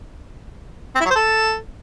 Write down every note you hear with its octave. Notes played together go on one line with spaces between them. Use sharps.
C4
E4
F#3
C5
A4